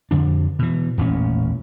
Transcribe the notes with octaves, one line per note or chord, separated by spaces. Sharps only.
F2 D3 D4
B2 E3
E1 A1 A#2 C#4